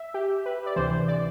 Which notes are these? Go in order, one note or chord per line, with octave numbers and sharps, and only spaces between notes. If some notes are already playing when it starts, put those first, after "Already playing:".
Already playing: E5
G4
B4
D5
D2 C3 E3 C5
D5